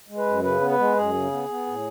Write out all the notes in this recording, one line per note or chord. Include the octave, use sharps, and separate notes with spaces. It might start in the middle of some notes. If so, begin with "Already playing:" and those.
G#3
B4
F#2
C#3 B4
B3
B4
G#3
F#2 G#4
C#3
B3
B3
A2